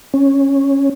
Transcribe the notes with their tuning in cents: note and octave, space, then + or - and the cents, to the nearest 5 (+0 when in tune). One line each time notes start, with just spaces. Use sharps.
C#4 -10